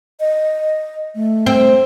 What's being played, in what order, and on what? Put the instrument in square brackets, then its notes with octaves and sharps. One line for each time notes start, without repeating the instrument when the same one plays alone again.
[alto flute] D#5
A3
[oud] C4